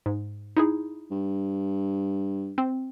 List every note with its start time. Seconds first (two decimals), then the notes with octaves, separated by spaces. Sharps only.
0.06 G#2
0.57 D#4 E4 G#4
1.11 G2
2.58 C4